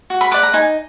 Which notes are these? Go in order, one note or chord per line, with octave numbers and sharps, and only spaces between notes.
F#4
B5
B4 D5 D6
A#5
D#4 G#5